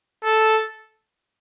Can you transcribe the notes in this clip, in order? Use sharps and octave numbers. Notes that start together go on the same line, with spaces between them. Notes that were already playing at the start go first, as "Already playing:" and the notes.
A4